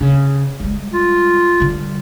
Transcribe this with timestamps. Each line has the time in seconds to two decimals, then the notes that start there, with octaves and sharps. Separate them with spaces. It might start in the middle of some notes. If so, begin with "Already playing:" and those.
0.01 C#3
0.60 G3 G#3
0.93 F4
1.60 D3 G3